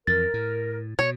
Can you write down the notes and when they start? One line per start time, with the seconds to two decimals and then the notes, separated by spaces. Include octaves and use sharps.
0.07 F2 E3 A#4 A6
0.34 A2
0.99 B2 C#5